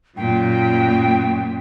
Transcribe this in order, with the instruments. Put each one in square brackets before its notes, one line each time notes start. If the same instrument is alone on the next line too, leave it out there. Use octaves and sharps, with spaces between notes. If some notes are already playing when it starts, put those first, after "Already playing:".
[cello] F#2 A#2 [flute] G5